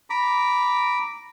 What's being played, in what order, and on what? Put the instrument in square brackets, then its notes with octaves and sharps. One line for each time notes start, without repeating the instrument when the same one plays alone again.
[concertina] A#5 B5 D6